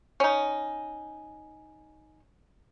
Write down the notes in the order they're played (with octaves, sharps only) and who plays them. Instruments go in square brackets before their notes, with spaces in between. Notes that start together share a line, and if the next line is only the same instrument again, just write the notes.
[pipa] C#4 D#4